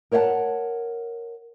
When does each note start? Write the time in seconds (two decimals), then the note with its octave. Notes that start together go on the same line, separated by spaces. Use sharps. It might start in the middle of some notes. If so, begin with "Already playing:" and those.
0.11 A#4 C5 C#5 E5 F#5 A5